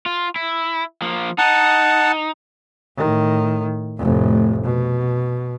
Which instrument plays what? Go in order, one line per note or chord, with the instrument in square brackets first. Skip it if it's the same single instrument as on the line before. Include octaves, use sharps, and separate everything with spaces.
[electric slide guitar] F4
E4
F3 A#3
[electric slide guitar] D#4 [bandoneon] F#5 A5
[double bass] A2 D#3
F1 A2
B2